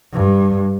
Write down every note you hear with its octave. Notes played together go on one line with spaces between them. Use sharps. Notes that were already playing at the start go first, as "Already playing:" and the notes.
G2